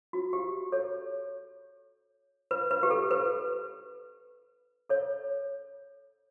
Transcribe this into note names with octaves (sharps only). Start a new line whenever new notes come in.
F#4
G4
A4 C#5
B4
B4
G4
A4
B4
A4 C#5